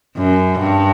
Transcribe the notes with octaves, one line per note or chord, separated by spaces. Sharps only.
F#2
G2